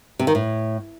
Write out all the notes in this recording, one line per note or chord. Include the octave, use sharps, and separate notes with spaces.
C3
D#3
A2